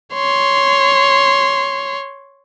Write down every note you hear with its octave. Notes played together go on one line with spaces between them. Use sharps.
C#5 C6